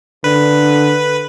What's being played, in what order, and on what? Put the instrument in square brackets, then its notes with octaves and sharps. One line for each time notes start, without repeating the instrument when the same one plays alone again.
[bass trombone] D3 [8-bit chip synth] B4